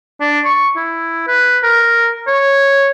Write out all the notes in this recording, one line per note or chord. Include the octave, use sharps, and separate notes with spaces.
D4
C#6
E4
B4
A#4
C#5